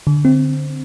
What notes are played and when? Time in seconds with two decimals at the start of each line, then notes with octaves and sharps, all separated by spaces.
0.07 D3
0.25 C4